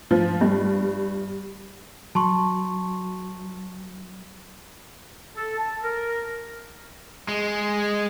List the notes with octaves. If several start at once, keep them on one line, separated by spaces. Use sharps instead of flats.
F3
G2
F#3 A5 C6 C#6
A4
A5
A#4
G#3